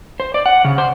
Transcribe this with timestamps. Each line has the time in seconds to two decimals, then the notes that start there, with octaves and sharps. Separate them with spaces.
0.20 C5
0.34 D5
0.46 F#5
0.65 C#3
0.78 C5